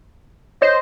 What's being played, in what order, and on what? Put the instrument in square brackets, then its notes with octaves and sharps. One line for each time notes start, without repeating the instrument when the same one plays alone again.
[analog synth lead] C5 [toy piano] C#5 [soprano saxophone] D#5